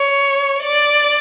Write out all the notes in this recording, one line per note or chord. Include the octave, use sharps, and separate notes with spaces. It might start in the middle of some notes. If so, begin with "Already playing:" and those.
Already playing: C#5
D5